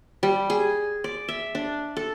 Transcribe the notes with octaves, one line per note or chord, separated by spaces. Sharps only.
G3
G#4
D5
E5
D4
A4